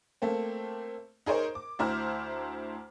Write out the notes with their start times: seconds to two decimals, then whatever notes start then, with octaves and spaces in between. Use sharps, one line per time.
0.22 A3 A#3 C4
1.26 D#4 G#4 A#4 C5 C#5
1.55 D6
1.79 D2 E4 C5 A#5 F6